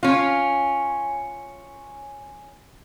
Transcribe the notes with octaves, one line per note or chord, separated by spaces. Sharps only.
C#4 F4